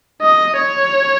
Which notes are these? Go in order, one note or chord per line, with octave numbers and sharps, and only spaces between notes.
D#5
C#5